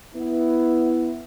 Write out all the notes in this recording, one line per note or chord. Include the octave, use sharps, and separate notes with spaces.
B3 E4